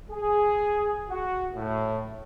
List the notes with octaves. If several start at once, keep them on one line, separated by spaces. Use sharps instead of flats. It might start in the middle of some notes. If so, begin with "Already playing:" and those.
G#4
F#4
A2